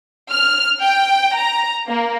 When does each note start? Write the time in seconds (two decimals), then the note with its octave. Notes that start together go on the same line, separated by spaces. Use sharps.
0.31 F6
0.81 G5
1.36 A#5
1.87 A#3